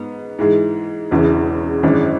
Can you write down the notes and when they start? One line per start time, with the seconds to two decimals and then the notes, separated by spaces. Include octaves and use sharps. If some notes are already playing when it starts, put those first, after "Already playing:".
Already playing: G#2 B3
0.39 G#2 E3 G#3
1.11 E1 E2 C#3 E3
1.83 G#1 F#2 E3 G#3 D4